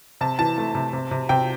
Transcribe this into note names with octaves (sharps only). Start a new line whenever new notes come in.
C3 A5
E3 A5
A3
C3
C3
C3
C3 G5